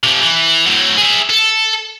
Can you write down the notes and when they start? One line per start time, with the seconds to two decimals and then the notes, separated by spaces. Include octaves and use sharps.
0.04 C3 F3
0.21 E3
0.66 A2 F#3
0.97 G#4 E5
1.30 A4